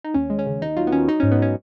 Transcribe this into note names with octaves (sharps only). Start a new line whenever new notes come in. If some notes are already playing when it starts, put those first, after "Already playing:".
D#4
D#2 C#4
G#3
C#4
C#3
D#2 D#4
F#3 F4
B3
D#3 C#4
F#3 D#4
G#2 C#4
B3
F#3 C#4